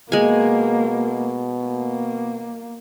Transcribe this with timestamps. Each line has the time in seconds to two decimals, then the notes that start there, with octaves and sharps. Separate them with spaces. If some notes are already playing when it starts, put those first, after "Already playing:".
0.12 B2 G#3 A#3 G#5
1.64 A#3